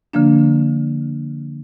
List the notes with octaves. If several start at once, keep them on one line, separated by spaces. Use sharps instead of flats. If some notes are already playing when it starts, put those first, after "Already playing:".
D3 F3 A#3 D4